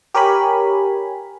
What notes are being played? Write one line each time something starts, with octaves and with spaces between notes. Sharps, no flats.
G4 A#4 C#5 G#5 B5